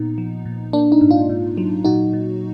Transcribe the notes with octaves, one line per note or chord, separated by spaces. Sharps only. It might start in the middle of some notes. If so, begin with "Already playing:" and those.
Already playing: A#2 B3 D#4
F3
A#2
A#3 D4
D#4
G#2
D4 F4
G#2
F#3
A#2 D#4 F#4
A#2